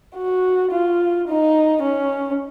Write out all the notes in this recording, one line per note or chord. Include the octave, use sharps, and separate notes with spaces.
F#4
F4
D#4
C#4